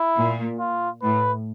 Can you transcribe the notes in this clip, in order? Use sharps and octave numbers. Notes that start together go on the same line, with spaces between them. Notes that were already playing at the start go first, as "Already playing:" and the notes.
Already playing: E4
A#2
F4
A2 B4